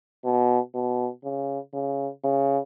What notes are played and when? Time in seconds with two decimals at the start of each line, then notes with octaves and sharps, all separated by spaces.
0.25 B2
0.75 B2
1.24 C#3
1.74 C#3
2.24 C#3